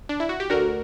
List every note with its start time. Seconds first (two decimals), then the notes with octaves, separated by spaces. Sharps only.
0.09 D4
0.20 E4
0.29 F#4
0.40 G4
0.50 D2 D3 F#4 A#4